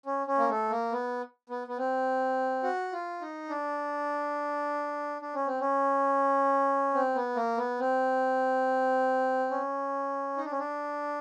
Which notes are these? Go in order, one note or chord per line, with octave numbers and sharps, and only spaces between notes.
C#4
C#4
A#3
A3
A#3
B3
B3
B3
C4
F#4
F4
D#4
D4
D4
C#4
C4
C#4
C4
B3
A#3
B3
C4
C#4
D#4
D4
C#4
D4